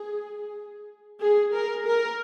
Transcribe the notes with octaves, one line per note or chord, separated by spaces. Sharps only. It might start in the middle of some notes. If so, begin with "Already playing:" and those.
Already playing: G#4
G#4
A#4
A#4